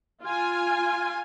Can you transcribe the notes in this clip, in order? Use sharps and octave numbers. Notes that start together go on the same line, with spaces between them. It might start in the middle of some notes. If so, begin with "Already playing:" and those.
F4 G#5